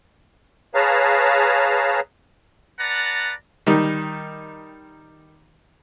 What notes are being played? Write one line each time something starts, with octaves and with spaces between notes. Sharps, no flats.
G#4 B4 C#5 F5 A5 A#5
B4 D5 F#5 A5 A#5
D#3 G3 D#4